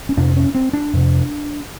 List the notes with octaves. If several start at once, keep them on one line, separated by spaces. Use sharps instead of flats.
C#4
F2 C3 D4
C#4
C4
D4
F2 C3